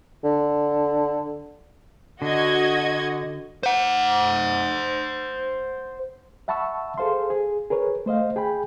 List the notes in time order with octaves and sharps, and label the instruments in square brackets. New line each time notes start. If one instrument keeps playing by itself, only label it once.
[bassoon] D3
[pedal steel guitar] D3 [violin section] F#4 D#5 G#6
[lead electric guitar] C5 F#5
[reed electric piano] E5 F#5 A5 B5 C#6 E6
G#4 A4 C5 F5 C6
G#4
G#4 A#4 B4 C#5
A3 C5 D#5 F5
G#4 G5 G#5 B5